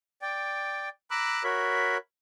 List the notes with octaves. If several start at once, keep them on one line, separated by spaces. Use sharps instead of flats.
D5 G5
A#5 B5 D6 E6 F#6
F#4 A#4 C#5 E5 B5